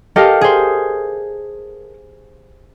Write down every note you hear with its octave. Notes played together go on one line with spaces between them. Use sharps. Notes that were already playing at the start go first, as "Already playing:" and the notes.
G4 A4 A#4 D#5 F5
G#4 C5